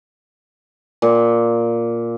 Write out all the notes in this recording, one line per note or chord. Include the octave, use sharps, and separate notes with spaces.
A#2